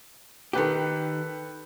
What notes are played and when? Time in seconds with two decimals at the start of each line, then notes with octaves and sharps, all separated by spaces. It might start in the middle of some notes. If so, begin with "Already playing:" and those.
0.53 D#3 G4 A4 B4 G5